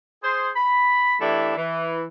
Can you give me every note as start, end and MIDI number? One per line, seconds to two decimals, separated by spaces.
0.23 0.50 68
0.23 0.50 72
0.56 1.15 83
1.20 1.55 52
1.20 1.55 57
1.20 1.55 62
1.20 1.55 64
1.20 1.55 67
1.20 1.55 81
1.57 2.04 52